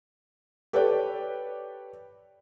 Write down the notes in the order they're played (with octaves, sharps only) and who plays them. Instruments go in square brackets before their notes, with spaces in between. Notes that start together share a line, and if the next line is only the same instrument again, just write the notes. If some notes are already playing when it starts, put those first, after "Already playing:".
[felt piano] G4 A4 B4 C#5 D5 G5